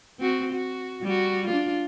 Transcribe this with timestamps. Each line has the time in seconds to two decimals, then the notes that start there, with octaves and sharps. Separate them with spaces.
0.19 C4 F#4
0.53 F#4
1.03 G3 F#4
1.47 D4 F4